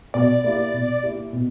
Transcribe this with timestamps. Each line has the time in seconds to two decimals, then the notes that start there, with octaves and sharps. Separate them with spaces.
0.14 B2 D5
0.44 A#3 E4 G4
0.74 B2
1.03 A#3 E4 G4
1.33 B2